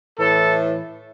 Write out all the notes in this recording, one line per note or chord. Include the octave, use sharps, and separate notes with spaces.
A2 E3 A4